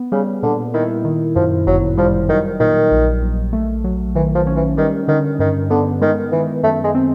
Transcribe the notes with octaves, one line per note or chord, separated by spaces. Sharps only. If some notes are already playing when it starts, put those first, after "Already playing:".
Already playing: B3
C#3 G3
A#2 D3
D#3 E4
D#3
F#2 F3
G1 F#3
F3 G3
D#3 F#3
A#2 D#3
A#1
A#1
A3
F#3
D#3 E3
F3
C#4
E3
D#3 G3
D3 D#3
G2 D#3
D3 B3
D#3 G#3
D#3 E3
F#2 A3
G#3
C4